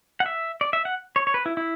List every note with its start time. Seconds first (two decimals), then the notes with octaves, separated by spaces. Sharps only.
0.20 F#5
0.26 E5
0.61 D5
0.73 E5
0.85 F#5
1.16 C#5
1.27 C#5
1.34 B4
1.46 E4
1.57 E4